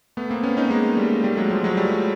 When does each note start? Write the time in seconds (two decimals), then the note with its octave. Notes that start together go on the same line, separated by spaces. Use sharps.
0.17 A3 B3
0.30 A#3 C4
0.43 B3 C#4
0.57 C#4 D#4
0.70 G#3 A#3
0.97 G3 A3
1.24 G3 A3
1.37 F#3 G#3
1.51 F3 G3
1.64 F#3 G#3
1.77 G3 A3